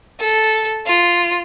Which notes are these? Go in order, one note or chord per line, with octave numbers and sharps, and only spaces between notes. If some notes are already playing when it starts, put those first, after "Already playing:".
A4
F4